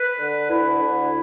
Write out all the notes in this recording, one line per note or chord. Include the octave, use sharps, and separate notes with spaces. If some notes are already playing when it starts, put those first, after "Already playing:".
Already playing: B4
D3
D2 E4
D3